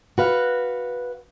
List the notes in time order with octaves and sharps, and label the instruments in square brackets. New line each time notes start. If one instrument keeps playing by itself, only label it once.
[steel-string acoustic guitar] F#4 B4 F5